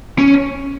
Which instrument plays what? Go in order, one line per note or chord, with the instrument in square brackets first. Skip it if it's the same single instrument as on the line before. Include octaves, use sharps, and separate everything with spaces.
[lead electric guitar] C#4